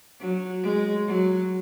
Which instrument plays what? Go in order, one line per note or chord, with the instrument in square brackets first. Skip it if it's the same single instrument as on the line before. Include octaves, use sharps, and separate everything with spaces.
[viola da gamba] F#3
G#3
F#3